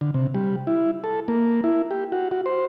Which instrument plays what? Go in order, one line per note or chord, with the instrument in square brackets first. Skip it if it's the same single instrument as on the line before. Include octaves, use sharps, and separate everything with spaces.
[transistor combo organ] D3
C3
G3
E4
A4
A#3
E4
G4
F#4
F#4
C5